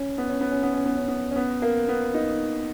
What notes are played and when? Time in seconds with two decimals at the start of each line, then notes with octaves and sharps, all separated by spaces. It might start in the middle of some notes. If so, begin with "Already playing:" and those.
Already playing: C#4
0.18 B3
0.29 C#4
0.41 B3
0.52 C#4
0.63 B3
0.74 C#4
0.85 B3
0.96 C#4
1.08 B3
1.31 C#4
1.36 B3
1.62 A#3
1.89 B3
2.14 D#4